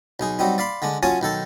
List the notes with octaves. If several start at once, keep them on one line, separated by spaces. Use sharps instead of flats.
B1 D#4 G#4
F#3 G3 C4 D#4
D5 F5 B5 C6
D3 G#3 D4
F#3 C#4 F4 G#5 A5 D#6
B1 D#3 A4 A5